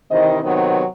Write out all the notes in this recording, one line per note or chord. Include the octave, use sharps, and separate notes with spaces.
C3 D#3 E3 C5 D#5
C3 D#3 F#3 B3 C4 D#4